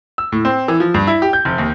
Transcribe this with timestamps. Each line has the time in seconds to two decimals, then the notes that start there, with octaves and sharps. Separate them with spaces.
0.18 E6
0.32 A2
0.45 C4
0.68 E3
0.80 F3
0.94 G2
1.07 E4
1.22 G4
1.33 G6
1.45 F1
1.58 D#2